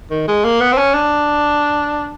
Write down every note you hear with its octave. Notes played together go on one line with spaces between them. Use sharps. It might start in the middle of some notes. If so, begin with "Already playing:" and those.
D#3
G#3
A#3
B3
C4
C#4
D4